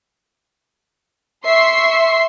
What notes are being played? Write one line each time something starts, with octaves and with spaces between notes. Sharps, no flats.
E5 C6 C#6 C7